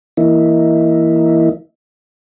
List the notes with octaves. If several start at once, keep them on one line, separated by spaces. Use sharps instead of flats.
E3 A#3 D#4 E4